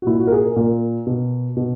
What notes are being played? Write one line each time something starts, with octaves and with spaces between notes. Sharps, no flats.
F#4
A#2 E4
F#4
A#4
G#4
A#4
A#2 A#4
B2
B2